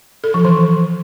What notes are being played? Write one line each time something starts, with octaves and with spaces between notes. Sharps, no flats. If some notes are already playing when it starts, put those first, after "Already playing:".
A4
F3
E3